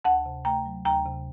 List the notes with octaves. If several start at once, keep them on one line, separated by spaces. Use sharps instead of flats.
D2 F#5 A5
C3
A3 G5 A#5
F#3
D2 G5 A#5
C3